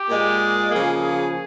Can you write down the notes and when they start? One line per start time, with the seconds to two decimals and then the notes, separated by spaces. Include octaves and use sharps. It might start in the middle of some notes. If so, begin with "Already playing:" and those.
Already playing: G4
0.10 A#2 G#3
0.70 C#3 F3 A#3 G#4
1.01 G#4